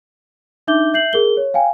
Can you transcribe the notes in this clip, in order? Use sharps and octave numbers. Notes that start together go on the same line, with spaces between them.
D4 D#4 E5 D6 G6 G7
E5 G6 C7 F#7
G#4 A#4 G7
C#5
F5 G5 G#5